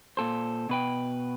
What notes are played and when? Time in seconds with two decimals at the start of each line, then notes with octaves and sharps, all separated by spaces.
0.17 A#2 A4 C5
0.69 B2 B4 G5